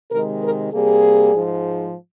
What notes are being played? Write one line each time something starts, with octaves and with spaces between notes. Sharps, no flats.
C3 D#3 G#3 A#4
A#4
C3 G3 A#3 G#4
G#2 F3 G#3